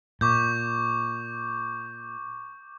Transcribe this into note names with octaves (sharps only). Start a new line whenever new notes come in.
A#2 C#6 D6 G6